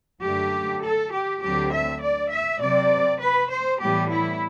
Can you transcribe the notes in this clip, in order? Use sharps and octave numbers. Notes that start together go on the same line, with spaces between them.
F#2 D3 A3 G4
A4
G4
D2 D3 F#3 C4 G4
E5
D5
E5
C3 F#3 C4 D5
B4
C5
A2 E3 G3 B3 G4
E4